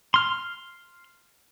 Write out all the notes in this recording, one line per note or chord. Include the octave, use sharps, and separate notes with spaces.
C6 F6